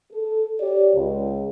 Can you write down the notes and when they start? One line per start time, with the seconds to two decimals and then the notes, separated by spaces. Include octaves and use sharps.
0.13 A4
0.61 G4 C#5 D5
0.94 C#2